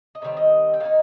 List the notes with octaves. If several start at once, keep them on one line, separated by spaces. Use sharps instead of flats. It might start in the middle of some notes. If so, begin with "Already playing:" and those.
D#5
C3 D#3 G3 C4 C#5
D#5
G5
D#3 A#3 D#4 F5